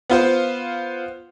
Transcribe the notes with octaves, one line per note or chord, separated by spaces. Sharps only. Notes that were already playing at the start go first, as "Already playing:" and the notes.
B3 F4 C5